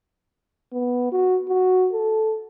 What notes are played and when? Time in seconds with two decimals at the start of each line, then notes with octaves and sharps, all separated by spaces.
0.73 B3
1.12 F#4
1.49 F#4
1.93 A4